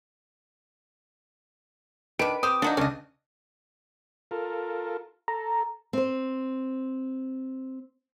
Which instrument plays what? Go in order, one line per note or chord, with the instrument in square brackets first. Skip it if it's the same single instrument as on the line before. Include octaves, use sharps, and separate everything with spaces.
[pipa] D#3 D4 [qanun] B4 [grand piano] D7
[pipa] C4 G4 [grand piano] D#6
[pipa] F3 F#3 D#4 [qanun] D4
[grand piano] C#2 C#3 [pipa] C#4 D#5
[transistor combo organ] F4 A4 A#4
[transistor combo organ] A4 [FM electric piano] A#5
[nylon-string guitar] C4 C5